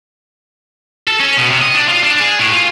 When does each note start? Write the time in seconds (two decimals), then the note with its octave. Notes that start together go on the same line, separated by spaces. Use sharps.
1.08 A4
1.20 C#4
1.38 B2
1.50 C3
1.62 D#5
1.75 D4
1.89 F4
2.04 D4
2.20 G#4
2.39 A2
2.53 F4